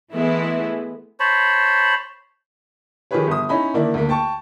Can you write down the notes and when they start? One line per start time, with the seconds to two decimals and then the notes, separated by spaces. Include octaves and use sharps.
0.14 E3 G#3 A3 B3 E4
1.20 C5 C#5 A5 B5
3.11 D#3 F3 G4 G#4 B4 C#5
3.27 G1 D#6
3.49 C#4 D#4 E4 B5
3.74 D3 D#3 A#3 D4 E4
3.94 D2 A#3
4.09 G5 A5 C#6